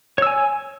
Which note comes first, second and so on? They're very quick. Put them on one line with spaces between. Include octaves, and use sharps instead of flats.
C#5 E6 G#5